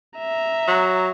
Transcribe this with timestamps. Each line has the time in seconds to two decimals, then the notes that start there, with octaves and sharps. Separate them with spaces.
0.19 E5 A#5
0.68 F#3